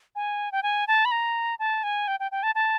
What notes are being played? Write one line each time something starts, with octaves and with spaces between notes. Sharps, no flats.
G#5
G5
G#5
A5
B5
A#5
A5
G#5
G5
G5
G5
A5
A5